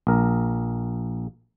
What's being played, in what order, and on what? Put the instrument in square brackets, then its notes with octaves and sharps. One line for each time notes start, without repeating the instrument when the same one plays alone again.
[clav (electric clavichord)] A#1 A#4